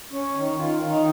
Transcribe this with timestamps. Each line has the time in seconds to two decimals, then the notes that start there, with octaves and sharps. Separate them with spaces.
0.12 C#4
0.35 D#3
0.59 D#3 F4
0.82 D#3
0.90 D#4